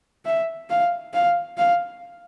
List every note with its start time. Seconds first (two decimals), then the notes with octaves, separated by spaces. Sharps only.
0.25 E5
0.70 F5
1.13 F5
1.57 F5